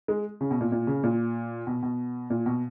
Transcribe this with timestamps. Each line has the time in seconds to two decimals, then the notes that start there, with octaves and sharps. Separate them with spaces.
0.08 G#3
0.41 C#3
0.51 B2
0.61 A#2
0.72 A#2
0.87 C#3
1.03 A#2
1.67 B2
1.83 B2
2.30 A#2
2.46 B2